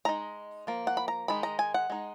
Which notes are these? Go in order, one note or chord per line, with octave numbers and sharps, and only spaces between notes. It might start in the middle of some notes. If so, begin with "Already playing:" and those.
G#3 D#4 A#5
F3 A#3
F#5
B5
A#5
D#3 G#3 D#4 B5
A#5
G#5
F#5
G#3 D#4